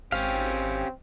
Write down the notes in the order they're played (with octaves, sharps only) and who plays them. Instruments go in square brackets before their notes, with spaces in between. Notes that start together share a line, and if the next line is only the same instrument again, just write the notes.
[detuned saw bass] G#1 [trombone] C4 [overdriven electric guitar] C#4 G4 [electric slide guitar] F5